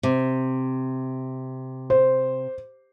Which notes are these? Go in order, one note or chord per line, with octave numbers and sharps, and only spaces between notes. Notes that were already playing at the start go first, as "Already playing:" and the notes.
C3
C5